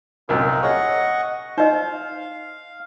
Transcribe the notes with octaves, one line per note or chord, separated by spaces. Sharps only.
C2 F#2 A#2 C4 D#4 F4
G#4 C#5 D#5 F#5 C#6
D#4 C5 D#5 F5